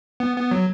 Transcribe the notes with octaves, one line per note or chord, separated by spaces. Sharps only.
B3
B3
F#3